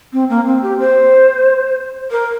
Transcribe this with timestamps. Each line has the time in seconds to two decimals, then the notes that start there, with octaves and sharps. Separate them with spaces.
0.13 C4
0.29 A#3
0.46 C4
0.62 G4
0.79 C5
2.11 A#4